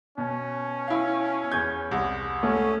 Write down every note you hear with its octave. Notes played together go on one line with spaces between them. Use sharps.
B2 C#4
E4 F5
E2 G6 G#6
C2
A3 C#4